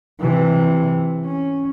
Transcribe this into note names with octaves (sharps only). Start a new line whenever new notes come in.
C3 E3
C#4